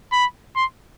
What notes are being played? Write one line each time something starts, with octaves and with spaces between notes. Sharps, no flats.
B5
C6